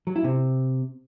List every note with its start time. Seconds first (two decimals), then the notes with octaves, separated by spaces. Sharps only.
0.07 F#3
0.16 E4
0.24 C3